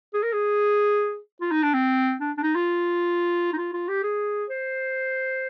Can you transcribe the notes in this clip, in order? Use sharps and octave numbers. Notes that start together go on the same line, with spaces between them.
G#4
A#4
G#4
F4
D#4
D4
C4
D4
D4
D#4
F4
D#4
F4
F4
G4
G#4
C5